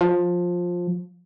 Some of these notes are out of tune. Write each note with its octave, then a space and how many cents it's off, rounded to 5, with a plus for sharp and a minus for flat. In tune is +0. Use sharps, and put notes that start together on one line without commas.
F3 +15